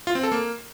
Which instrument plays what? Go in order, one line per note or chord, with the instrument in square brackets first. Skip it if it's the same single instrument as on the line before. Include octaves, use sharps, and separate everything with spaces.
[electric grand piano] F4
C4
A4
A#3